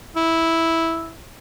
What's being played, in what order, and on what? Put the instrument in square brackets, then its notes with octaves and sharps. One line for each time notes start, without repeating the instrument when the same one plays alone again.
[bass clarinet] E4